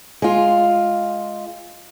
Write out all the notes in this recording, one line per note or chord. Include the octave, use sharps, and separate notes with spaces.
G#3 F4